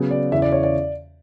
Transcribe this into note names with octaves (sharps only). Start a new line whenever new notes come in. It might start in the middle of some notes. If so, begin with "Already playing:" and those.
Already playing: C#3 F#3 B3
D5
E2 C#3 E3 E5
D5
C#5
D5